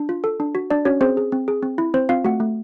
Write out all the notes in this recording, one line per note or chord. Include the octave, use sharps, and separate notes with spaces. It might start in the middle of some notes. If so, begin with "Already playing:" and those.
Already playing: D4
F4
A4
D4
F#4
D4 D5
C#4 F#4 C#5
C4 G#4 C5
G#4
C4
G#4
C4
E4
C4 C5
C4 F4 F5
A3 F#4 F#5
A3